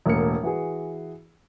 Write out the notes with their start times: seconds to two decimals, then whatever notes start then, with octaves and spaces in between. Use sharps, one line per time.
0.06 E1 A2 A#3 C#7
0.43 E3 F#4 G#4